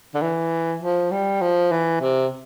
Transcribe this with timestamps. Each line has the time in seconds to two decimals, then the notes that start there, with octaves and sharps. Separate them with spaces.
0.14 D3
0.21 E3
0.82 F3
1.11 G3
1.41 F3
1.72 E3
2.01 C3